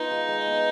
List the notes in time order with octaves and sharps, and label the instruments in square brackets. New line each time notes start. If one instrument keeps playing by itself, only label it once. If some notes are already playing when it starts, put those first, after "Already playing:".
Already playing: [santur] B3 F4 [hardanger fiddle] D#4
[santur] G#3
G#3
B3